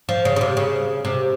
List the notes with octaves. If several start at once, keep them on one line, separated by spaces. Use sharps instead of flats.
F3
C#3
C#3
C3
C#3
C3